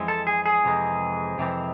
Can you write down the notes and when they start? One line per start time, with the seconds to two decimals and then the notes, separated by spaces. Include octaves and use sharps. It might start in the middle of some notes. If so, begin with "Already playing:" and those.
Already playing: F2 E3 G#3 C4
0.08 A4
0.27 G#4
0.46 G#4
0.64 F2 C3 E3 G#3 C4
1.38 F2 C3 E3 G#3 C4